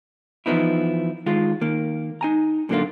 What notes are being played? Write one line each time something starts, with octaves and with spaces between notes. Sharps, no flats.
E3 F3 B3 D#4 E4
D#3 G#3 F4
D#3 A#3
D#4 G#5 A#5
F#2 A#2 D3 G#3 A#3 F4